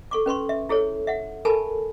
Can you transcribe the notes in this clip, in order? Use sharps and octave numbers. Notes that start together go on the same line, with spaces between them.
A4 C#6 D6
C#4 B4 C6 C#6
E5
E4 G#4 A4 C#5
E5 F#5
G4 A4 A#4 G#5 A5 B5